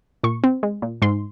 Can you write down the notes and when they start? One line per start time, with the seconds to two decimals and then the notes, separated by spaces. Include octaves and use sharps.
0.23 A#2 C#6
0.44 C4
0.63 G#3
0.82 A#2
1.02 G#2 C6